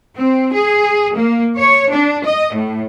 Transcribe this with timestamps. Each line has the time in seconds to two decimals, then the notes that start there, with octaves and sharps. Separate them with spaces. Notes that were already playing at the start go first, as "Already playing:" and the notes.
0.17 C4
0.53 G#4
1.16 A#3
1.57 C#5
1.92 D4
2.25 D#5
2.55 A2